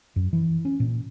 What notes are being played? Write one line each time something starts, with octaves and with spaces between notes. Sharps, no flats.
F#2
E3
C#4
A#2